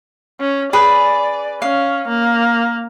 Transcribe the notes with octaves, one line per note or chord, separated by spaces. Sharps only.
C#4
G#4 B4 D5
C#4 F5
A#3